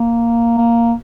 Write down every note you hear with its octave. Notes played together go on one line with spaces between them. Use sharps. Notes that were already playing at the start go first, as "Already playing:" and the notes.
Already playing: A#3
A#3